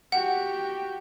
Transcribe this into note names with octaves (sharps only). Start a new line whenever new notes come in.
F#4 G4 F#5